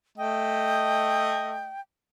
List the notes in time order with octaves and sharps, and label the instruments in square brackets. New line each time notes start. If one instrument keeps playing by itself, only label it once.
[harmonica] A3 D#5 [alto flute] G5